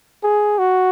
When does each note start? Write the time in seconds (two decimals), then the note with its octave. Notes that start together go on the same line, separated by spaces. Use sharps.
0.24 G#4
0.59 F#4